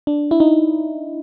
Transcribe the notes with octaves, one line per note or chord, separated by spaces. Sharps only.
D4
E4
D#4